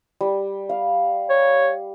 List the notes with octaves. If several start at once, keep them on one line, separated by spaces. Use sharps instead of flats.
G3
F5
C#5